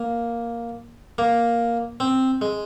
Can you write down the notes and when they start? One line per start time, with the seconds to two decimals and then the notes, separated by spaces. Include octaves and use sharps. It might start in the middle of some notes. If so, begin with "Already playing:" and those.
Already playing: A#3
1.18 A#3
2.00 C4
2.41 G#3